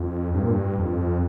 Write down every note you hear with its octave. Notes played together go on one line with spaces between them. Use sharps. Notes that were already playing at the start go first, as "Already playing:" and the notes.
Already playing: F2
G2
A#2
G2
F2